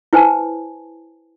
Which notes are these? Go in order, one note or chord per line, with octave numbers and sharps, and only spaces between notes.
E4 B4 C5 G#5 A5